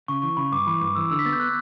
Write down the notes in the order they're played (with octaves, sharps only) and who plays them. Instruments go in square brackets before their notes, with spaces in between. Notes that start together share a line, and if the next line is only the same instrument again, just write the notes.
[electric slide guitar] C#3 [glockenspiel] C#6
[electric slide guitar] E3 [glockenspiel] C#6
[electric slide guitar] C#3 [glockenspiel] B5
[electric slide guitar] G2 [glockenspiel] D6
[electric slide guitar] E3 [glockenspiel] B5
[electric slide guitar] G2 [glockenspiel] D6
[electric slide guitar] E3 [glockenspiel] E6
[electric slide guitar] D3 [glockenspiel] E6
[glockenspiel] B6
[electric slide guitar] B3 [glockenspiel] A6
[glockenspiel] G6
F#6